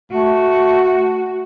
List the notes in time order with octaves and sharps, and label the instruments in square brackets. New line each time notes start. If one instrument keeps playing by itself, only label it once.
[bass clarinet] A3 [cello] F#4